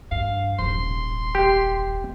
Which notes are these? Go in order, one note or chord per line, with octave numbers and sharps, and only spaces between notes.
G2 F5
D#1 G#1 C6
G4